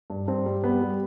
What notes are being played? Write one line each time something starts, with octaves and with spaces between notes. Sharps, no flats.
G2
G2 C4
G3
G3 B3
G3